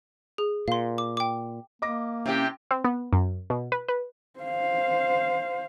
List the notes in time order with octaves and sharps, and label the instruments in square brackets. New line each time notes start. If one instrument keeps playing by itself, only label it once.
[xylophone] G#4
[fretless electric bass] A#2 [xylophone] F5 C6
[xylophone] D6
G5 D6
[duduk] A#3 [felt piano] D#5 D6 A#6
[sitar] C3 E4 G4 [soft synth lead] C#4
[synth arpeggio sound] C4
B3
F#2
B2
B4
B4
[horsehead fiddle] C5 F5